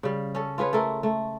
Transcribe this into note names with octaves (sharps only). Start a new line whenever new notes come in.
C#3 G3
C#4 A4
F4 G#4 B4 C#5
A3 A4 A#4
A3